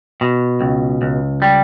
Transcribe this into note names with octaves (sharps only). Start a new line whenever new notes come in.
B2
C#2
C#2
G3